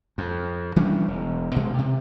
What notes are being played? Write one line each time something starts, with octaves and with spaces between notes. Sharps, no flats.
F2
E3 G3 C#4 D4
E1
A1 B2 G#3
C3